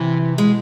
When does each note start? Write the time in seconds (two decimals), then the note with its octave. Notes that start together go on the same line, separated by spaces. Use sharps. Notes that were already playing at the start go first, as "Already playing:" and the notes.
Already playing: C3 E3
0.38 B2 G#3